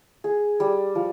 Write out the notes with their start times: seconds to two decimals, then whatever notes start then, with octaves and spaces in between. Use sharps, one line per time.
0.24 G#4
0.60 G3
0.95 F3